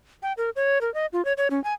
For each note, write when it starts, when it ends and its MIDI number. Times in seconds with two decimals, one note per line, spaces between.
0.23 0.33 79
0.37 0.50 70
0.56 0.81 73
0.81 0.93 70
0.94 1.06 75
1.13 1.24 65
1.25 1.33 73
1.37 1.48 73
1.50 1.62 61
1.64 1.74 80